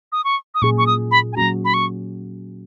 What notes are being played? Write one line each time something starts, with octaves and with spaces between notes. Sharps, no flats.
D#6
C#6
D#6
A#2 F#3 C#4 G#4 C#6
C#6
D#6
B5
G#5
F#3 A#3 C#4 F#4 A#5
B5
C#6